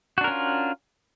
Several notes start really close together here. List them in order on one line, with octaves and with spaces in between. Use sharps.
F#4 D4 A#4 C#4 F4